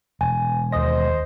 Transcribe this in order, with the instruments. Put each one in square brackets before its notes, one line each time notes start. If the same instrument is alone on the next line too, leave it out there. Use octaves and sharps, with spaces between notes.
[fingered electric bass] E1 [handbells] G#5
[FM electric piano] D#2 A#6 [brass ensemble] C5 [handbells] D#5 D#6